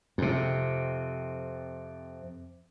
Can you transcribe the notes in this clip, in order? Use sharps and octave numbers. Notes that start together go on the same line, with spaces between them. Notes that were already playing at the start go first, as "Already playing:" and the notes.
F2 C3